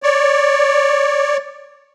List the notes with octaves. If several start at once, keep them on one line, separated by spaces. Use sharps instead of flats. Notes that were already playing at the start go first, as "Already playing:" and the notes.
C#5 D5